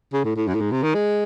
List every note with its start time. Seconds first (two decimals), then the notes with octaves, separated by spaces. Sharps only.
0.13 C#3
0.25 A2
0.36 A2
0.47 F#2
0.55 A2
0.60 G#2
0.71 C3
0.83 D#3
0.94 G#3